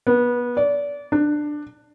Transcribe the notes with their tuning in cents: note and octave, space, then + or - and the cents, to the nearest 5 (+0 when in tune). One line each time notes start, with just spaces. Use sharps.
B3 -25
D5 -30
D4 +15